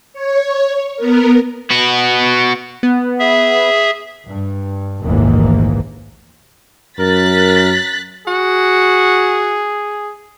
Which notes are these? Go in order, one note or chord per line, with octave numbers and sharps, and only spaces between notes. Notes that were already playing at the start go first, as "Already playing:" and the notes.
C#5
B3 A#4
B3 F#4
B3
G#4 E5
G2
F1 A#1 D#2 G#2 E3 A#3
F#2 A#4 F#6 A6 B6
F#4 G#4